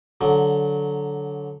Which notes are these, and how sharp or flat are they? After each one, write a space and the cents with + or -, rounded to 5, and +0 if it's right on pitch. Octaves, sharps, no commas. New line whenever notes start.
D3 -15 F#3 -5